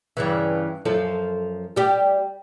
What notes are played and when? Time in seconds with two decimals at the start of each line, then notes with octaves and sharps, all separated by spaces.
0.17 G2 C#3 E3
0.85 F#2 F3 A4
1.76 G3 G4